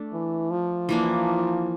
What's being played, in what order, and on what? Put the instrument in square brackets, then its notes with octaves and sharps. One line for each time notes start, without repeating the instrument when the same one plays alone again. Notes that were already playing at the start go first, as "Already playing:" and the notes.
Already playing: [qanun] A3 D4
[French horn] E3
F3
[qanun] E3 A#3 D4